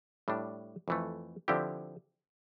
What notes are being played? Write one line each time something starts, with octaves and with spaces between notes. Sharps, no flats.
A2 G3 D4
F2 E3 A3
D3 F3 C4 E4 G4